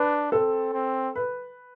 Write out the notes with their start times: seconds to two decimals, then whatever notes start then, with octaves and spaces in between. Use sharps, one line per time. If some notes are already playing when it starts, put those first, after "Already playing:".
Already playing: D4 B4
0.32 C4 A4
0.73 C4
1.15 B4